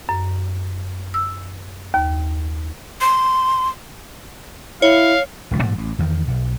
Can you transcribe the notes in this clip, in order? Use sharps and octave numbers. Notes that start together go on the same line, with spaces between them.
F#2
E6
D#2
C6
E4 C#5 F5
D1 C#2 F3
G2 A#2 E3 G3
A1
E2 D#3
B1